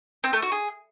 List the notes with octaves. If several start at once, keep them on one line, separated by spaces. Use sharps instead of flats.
C4
A3
F#4
G#4